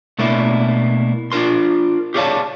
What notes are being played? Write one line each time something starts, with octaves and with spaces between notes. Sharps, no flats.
B2 A3 A#3 D4 E4
D4 F4 A#4 C6
G4 G#4 C#5 D5 F5 A5